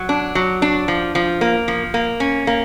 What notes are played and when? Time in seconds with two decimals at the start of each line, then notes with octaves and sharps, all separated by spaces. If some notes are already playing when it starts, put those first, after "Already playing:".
Already playing: F#3
0.09 D4
0.35 F#3
0.62 D4
0.88 F3
1.15 F3
1.41 A#3
1.68 F3
1.94 A#3
2.20 C#4
2.47 A#3